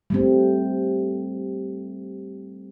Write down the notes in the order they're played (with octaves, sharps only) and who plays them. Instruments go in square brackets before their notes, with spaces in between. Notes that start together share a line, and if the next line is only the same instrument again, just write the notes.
[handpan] G3 A3 C4